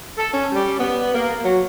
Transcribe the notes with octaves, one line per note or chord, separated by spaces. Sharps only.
A4
C#4
G3
B3
A#3
F#3